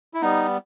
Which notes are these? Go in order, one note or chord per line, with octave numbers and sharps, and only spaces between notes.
E4
G3 B3 D#4